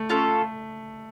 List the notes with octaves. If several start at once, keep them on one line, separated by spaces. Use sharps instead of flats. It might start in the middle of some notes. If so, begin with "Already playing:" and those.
Already playing: A3
C#4 F4 A4